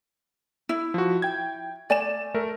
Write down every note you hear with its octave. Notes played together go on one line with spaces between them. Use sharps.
E4
F3 F#4
G5 G#6
A3 D5 G#5 E7
A3 A#4